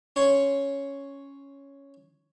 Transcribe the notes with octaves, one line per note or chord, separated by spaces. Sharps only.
C#4 C#5 C6 C#6